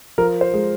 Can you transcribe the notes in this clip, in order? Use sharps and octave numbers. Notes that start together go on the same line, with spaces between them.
F3 A#4
C5
G#3